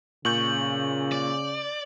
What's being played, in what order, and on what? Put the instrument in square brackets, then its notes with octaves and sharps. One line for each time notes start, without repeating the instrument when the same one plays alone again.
[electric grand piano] A#2 C#6 G6 [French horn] C#3 [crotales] F#7
[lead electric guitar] D5